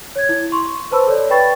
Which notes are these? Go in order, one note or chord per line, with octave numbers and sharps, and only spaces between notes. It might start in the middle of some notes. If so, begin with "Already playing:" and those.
C#5 G#6
E4
C6 C#6
B4 C5 A5 B5 E6
A4 C#5 D5
B4 D5 G5 B5 C#6 A6